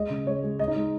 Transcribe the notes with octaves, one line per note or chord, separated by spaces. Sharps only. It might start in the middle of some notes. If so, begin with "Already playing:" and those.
Already playing: G#3 D#5
C#3
G#3 C#5
G#3
G#3 D#5
D#4
G#3